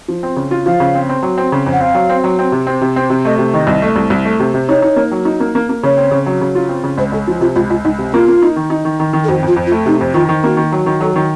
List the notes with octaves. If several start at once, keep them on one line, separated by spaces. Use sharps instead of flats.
F3
C4
C#3
F4
F3 F5
C#3
C4
C4
F#3
C4
C#3
F2
F#5
C4 F5
F#3
C4
F#3
C4
C3
C4
C3
C4
C3
A3 D#5
C3
D#3 D#5
C2
A3
C2
C2
A3
C3
C3
D#4 C#5
D#4
A#3
F#3
D#4
A#3
A#3
A#3
C#3 C#5
C4
C#3
F#3
C#3
F4
C4
C#3
C#2 C5
C#2 A4
F3 F#4
C3 F4
C#2 F4
C#2 F4
C#2 D#4
C3
A#3 F4
A#3
D#4
D#3
D#4
D#3
D#3
D#3
A4
F2 F#4
F2 F4
F2
F4
A3
C3 D#4
F2
D#3 F4
D#3
A#3 F#4
D#3
F#3
D#3
F#3 A4
D#3